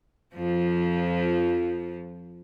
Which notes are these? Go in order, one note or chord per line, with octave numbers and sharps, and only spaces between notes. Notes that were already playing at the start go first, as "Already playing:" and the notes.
F2 F3